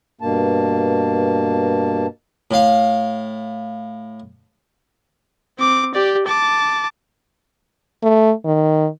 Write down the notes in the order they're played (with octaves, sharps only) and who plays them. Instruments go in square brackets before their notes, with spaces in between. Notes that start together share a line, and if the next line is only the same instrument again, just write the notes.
[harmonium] G2 B2 A#3 A5
[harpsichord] A2 F5
[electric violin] C4 D6
G4 D5
A5 D6
[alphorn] A3
D#3